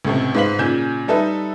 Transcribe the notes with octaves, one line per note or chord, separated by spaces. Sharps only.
C#2 A2 C3
G#2 B4 C5 F5 B6 F#7
A#2 C#3 G#5 G6 E7
G3 D#4 A4 B4 E5